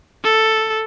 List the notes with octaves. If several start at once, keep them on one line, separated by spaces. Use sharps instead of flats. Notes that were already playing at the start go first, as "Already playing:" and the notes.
A4